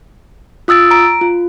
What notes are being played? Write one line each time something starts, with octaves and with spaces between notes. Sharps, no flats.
F4 D#6 E6 A6 D7
A#5 D7
F4